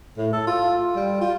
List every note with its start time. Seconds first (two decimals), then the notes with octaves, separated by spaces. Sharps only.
0.18 A2
0.33 A4
0.47 F4
0.96 G3
1.21 F4